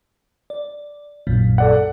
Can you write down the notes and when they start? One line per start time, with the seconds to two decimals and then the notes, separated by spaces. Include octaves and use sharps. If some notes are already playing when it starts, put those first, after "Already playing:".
0.50 D5
1.27 A#1 F#2 A#2
1.58 A4 D5 F#5